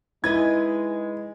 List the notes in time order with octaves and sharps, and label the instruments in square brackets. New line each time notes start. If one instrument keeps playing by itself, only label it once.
[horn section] G#3 [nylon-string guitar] D#4 B4 D#5 [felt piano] E4 [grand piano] G#6